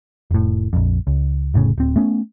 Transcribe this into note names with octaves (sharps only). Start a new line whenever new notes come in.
F1 A2
A#1 F2
C#2
F1 A2 C#3
D1 C4
A3 B3 C#4